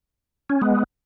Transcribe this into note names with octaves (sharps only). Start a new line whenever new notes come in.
C#4
G#3 B3